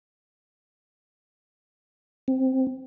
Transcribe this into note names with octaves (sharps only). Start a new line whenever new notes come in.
C4